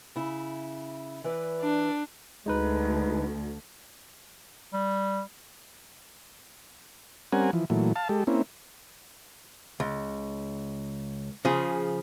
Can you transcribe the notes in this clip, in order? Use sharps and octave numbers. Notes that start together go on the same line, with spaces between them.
C#3 E4
E3 B4 D5
D4
D2 G#3 D#4 B4
G3
G3 C4 C#4 A#4 F#5 G#5
E3 F3
A#2 E3 F#3 A3
F5 A5
G#3 G4 A4
A#3 C4 C#4 E4
C#2
C#3 F3 G#4